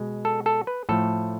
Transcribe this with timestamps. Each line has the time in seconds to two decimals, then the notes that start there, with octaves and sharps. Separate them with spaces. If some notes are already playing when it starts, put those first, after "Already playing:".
Already playing: B2 G#3
0.25 A4
0.46 A4
0.67 B4
0.89 A2 F3 A3 A4